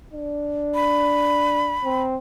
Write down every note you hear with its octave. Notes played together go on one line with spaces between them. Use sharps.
D4
B5
C4